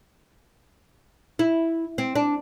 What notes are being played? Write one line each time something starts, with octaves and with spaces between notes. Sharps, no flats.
E4
C4
D4